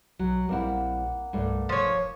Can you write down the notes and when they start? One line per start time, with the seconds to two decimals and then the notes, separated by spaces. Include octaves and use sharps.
0.19 B1 F#3
0.49 A#1 G3 A#3 C4 E4 F#5
1.33 C2 G2 A3 D5
1.69 D1 F3 C#5
1.96 D#1